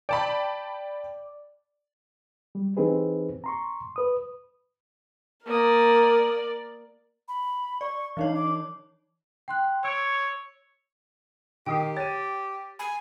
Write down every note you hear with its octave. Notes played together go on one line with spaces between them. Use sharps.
D5 G5 A5 B5
G3
E3 C4 D#4 G4 G#4 B4
A#5 C6 C#6
B4 D#6
A#3 A#4 D5 D#6
B5
D5 C#6
E3 D#4 C#5 F5
D6
G5 C6 F#6
C#5 E6 D7
D#3 G4 G5 D#6 C7
C#5 A6 D#7
G#5 B5